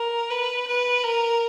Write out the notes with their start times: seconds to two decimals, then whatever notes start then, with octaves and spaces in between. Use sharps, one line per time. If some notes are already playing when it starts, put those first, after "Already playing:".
Already playing: A#4
0.30 B4
0.68 B4
1.04 A#4